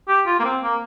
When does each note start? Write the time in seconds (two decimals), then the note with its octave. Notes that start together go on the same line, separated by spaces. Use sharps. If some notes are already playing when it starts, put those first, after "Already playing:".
0.08 G4
0.27 F4
0.40 A#3
0.45 C4
0.63 A#3